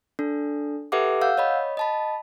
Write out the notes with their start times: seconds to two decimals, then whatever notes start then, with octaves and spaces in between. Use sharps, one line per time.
0.19 D4 A4
0.92 G4 A4 B4 E5 F#5 D6
1.21 F5 F#5 E6 G6
1.38 C#5 D#5 B5
1.77 D#5 A5 B5